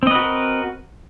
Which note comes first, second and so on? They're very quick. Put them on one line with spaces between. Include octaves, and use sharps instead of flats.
C4 D#5 B4 F#4 A#4